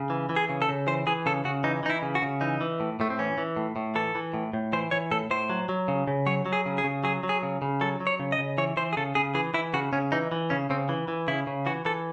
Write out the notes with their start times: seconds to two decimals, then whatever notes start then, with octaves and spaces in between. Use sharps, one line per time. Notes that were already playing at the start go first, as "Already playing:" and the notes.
Already playing: C#3
0.10 E3
0.29 E3
0.36 G#4
0.49 C#3
0.62 A4
0.69 C#3
0.87 E3 C5
1.07 E3 G#4
1.26 C#3 A4
1.45 C#3 F#4
1.64 E3 D#4
1.83 E3 D#4
1.90 E4
2.02 C#3
2.15 F#4
2.22 C#3
2.41 E3 D#4
2.61 E3
2.80 A2
3.00 A2 A3
3.10 C4
3.19 E3 C#4
3.38 E3
3.56 A2
3.76 A2
3.95 E3 A4
4.15 E3
4.34 A2
4.53 A2
4.73 E3 C5
4.91 E3 C#5
5.11 A2 A4
5.31 A2 C5
5.50 F#3
5.69 F#3
5.88 C#3
6.07 C#3
6.26 F#3 C#5
6.46 F#3
6.53 G#4
6.66 C#3
6.78 G#4
6.84 C#3
7.04 F#3 G#4
7.23 F#3
7.29 G#4
7.43 C#3
7.62 C#3
7.81 F#3 A4
8.00 F#3
8.07 C#5
8.20 C#3
8.32 D#5
8.38 C#3
8.58 E3 C#5
8.77 E3 C5
8.93 G#4
8.97 C#3 A4
9.15 C#3 G#4
9.35 E3 G#4
9.54 E3 E4
9.74 C#3 F#4
9.93 C#3 C#4
10.12 E3 D#4
10.32 E3
10.50 C#3 C#4
10.70 C#3 C4
10.89 E3
11.08 E3
11.28 C#3 E4
11.47 C#3
11.66 E3 F#4
11.85 E3 A4